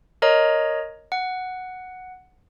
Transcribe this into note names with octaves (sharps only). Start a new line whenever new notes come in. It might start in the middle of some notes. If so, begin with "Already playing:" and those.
A#4 C#5 D#5 A#5
F#5